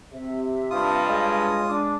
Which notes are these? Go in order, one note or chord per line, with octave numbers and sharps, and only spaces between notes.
C3 E5
G2 F4 D#6
G#3 C#5 D#5 G#5
D4 D6